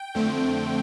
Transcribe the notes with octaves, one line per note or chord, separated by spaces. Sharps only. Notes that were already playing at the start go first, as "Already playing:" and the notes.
Already playing: G5
F2 D3 A3 C4